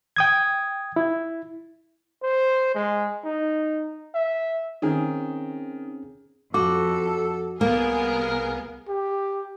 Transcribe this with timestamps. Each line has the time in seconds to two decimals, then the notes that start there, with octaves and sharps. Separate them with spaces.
0.16 G5 D#6 G#6
0.96 E4
2.23 C5
2.75 G#3
3.24 D#4
4.14 E5
4.82 D#3 C4 C#4 G#4
6.54 F2 F#4 A4 D6
7.61 C2 A#3 B3 G#4 A#4
8.88 G4